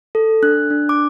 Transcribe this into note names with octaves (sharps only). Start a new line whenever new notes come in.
A4
D4 F#6
D4
D6